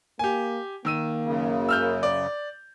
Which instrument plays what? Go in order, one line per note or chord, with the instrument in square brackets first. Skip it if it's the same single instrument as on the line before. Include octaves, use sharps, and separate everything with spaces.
[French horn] A#3 [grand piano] G4 G#5
[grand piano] D#3 E6 D#7 [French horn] A#3
[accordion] F#2 C#3
[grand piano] E6 F6 G6
D5